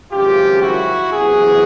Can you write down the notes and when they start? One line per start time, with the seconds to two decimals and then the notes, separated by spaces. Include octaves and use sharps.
0.12 G#1 F#2 C#3 F3 F4 G4
0.62 E4 F#4
1.12 F#1 E2 C3 E3 F#4 G#4